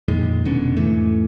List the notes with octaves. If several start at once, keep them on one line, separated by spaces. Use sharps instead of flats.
F2 A#2 D#3 G#3
F1 B2 D3 C#4
E2 G#2 E3 A3